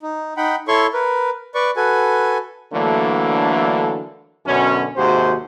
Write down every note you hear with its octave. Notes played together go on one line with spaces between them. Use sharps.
D#4
D#4 F#5 G5 B5
E4 A4 C#5 C6 C#6
A#4 B4
B4 D5 C#6
F#4 A4 B4 G#5
D3 E3 F#3 A3 A#3 D4
F#2 B2 D3 C#4
G#1 D#2 C3 F#4 G#4 C5